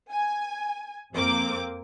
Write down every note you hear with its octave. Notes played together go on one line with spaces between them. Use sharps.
G#5
F2 A#3 C4 D6